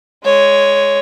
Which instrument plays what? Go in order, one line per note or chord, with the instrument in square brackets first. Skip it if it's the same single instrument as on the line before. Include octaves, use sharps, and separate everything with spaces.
[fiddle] G#3 C#5